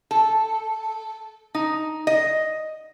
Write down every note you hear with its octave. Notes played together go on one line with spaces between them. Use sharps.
A4
D#4
D#5